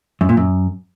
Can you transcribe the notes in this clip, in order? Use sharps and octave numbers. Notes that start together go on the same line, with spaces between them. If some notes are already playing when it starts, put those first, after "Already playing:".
F#2
A#2
F#2